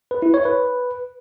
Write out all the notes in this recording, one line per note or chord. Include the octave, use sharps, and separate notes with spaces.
B4
E4
C#5
B4